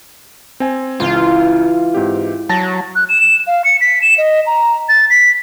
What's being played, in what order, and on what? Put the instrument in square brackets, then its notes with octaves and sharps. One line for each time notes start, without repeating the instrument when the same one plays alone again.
[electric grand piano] C4 G#5
[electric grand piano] C#2 [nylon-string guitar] E3 [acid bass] F4
[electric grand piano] G#2 C4 G4
[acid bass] F#3 [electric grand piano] A5 A6 A#6
[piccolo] F#6
E7
F5
C#7
B6
E7
D#5
A#5
A6
B6